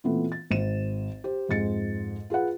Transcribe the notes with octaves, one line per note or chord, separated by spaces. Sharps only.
A#2 E3 A3 B3 C4
A6
G#1 D#7 E7
G4 C5
F2 G#2 G#3 A6 C#7
F4 G#4 B4 F#5